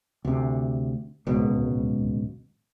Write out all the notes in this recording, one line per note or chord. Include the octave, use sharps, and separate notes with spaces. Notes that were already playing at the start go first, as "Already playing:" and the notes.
D2 C3
D1 G#1 C#2 B2